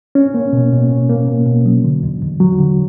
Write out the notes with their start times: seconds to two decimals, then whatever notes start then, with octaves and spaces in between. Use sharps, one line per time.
0.15 C#4
0.34 A#3
0.53 B2
0.72 B2
0.89 C#4
1.09 A#3
1.28 B2
1.46 B2
1.66 F#3
1.84 D3
2.03 E2
2.22 E2
2.40 F#3
2.59 D3